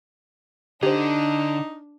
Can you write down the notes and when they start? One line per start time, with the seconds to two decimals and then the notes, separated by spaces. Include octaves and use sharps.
0.83 D3 D4 D#4 G4 C5